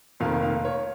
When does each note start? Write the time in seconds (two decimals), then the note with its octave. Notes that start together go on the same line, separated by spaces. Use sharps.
0.20 F1 F2 D#3 A#3 F5
0.42 F5
0.65 C#5